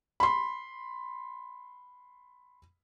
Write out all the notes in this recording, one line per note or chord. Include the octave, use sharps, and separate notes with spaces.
B5 C6